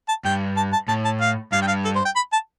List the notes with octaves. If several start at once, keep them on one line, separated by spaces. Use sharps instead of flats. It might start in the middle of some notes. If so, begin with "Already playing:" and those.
A5
G2 G5
A5
A5
A2 A5
A5
F5
G2 F5
G5
F5
A4
C5
G5
B5
A5